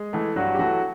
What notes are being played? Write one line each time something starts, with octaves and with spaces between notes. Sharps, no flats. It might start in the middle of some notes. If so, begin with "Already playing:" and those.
Already playing: G#3 G#4
E3 A3
G2 F#3 F#4
G4
E3 F#3 A3 F#4